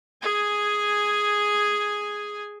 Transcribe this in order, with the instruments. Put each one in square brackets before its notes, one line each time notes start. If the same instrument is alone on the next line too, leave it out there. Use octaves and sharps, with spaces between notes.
[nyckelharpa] G#4 G#5